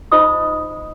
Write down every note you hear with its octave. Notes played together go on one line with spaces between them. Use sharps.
D#4 F4 C5 D#5 B5 D#6